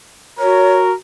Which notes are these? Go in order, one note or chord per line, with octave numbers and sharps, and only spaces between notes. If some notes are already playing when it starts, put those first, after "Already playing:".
F#4 A#4 C#5